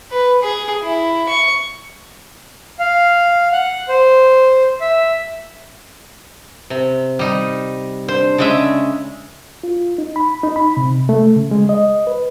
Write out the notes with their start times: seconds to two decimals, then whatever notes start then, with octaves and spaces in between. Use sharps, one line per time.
0.11 B4
0.42 G#4
0.82 E4
1.29 C#6
2.79 F5
3.52 F#5
3.89 C5
4.81 E5
6.70 C3
7.19 G3 D#4
8.08 D4 C5
8.38 C#3 G#3 E5
9.63 F4
9.98 D#4
10.16 B5
10.43 D#4
10.56 B5
10.77 C3
11.09 A3
11.36 C#3
11.51 G#3
11.69 D#5
12.07 B4